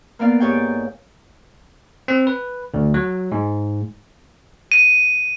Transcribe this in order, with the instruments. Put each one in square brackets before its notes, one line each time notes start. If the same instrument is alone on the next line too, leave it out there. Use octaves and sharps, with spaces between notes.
[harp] A#3 B3 A#4 D5 F5
G#2 G4 C#5 D5 G5
[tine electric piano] C4
B4
D2
F#3
G#2
[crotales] D#7